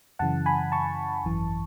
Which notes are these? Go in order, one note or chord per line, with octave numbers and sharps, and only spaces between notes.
F#2 C#3 E3 F#5 A5
G#5 B5
A5 C#6
G#1 F#2 E3